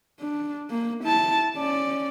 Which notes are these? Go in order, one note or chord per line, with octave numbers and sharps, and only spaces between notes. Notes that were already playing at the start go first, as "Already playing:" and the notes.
D4
A#3
E4 A5
C#4 D5